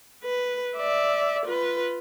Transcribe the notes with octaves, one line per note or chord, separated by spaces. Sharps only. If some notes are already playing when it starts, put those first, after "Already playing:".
B4
D5 E5
F4 B4